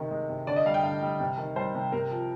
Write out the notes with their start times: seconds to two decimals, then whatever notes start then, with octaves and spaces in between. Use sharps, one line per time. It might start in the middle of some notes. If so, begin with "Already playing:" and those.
Already playing: C3 D#3
0.11 G#3
0.29 C3
0.47 D3 D5
0.56 D#5
0.66 G3 F5
0.74 G5
0.83 D3 F5
1.02 G3
1.20 C3
1.38 D#3
1.56 G3 C5
1.75 C3
1.92 C3 A#4
2.11 F3